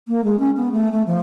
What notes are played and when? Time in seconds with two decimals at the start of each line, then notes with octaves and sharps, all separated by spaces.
0.08 A#3
0.24 G#3
0.39 C#4
0.57 B3
0.72 A3
0.91 A3
1.06 F3